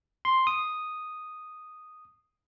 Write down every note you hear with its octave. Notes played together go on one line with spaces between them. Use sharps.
C6
D#6